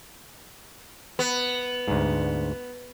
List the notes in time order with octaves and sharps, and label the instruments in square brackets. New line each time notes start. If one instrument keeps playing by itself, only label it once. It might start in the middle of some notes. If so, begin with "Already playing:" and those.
[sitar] B3
[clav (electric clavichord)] D2 G#2